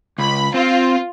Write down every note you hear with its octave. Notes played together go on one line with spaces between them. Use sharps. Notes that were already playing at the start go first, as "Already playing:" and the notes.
C#2 B5
C4 F4